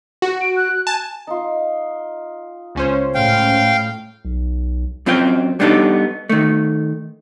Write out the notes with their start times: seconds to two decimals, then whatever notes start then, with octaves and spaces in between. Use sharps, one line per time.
0.22 F#4
0.41 D7
0.56 F#6
0.87 G#5 A5
1.27 D#4 F4
2.75 C#2 C#4 C5
3.15 A2 F5 G5
4.25 B1
5.06 F#2 C4 F4 C5 G5
5.60 G3 B3 D4 D#4 A4
6.29 D#3 A3